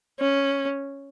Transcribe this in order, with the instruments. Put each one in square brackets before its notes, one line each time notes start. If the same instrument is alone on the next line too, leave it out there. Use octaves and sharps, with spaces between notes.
[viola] C#4